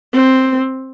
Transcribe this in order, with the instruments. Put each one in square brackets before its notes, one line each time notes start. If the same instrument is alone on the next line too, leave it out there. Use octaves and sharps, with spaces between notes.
[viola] C4